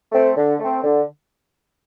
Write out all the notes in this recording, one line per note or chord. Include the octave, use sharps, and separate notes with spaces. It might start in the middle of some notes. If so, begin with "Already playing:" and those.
A3 C4
D3
A3 C4
D3